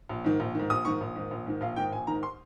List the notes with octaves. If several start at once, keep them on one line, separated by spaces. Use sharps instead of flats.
A#1
G#2 D#3
A#1
G#2 D#3
A#1 D#6
G#2 D#3 C#6
A#1
G#2 D#3
A#1
G#2 D#3
A#1 F5
G#2 D#3 G5
A#1 G#5
G#2 D#3 A#5
C6